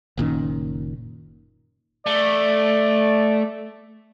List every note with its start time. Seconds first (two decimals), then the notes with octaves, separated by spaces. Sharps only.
0.17 F#1 A#2 D#3 C#4
2.06 A3 D5